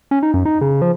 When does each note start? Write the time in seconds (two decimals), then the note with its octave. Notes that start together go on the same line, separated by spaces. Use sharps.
0.11 C#4
0.23 D#4
0.34 F#2
0.46 D#4
0.61 C#3
0.82 F3